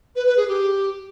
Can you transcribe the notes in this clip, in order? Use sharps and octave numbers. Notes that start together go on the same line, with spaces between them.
B4
B4
G#4
G4